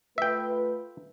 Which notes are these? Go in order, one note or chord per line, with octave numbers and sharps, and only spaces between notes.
A3 F4 B4 E5 G5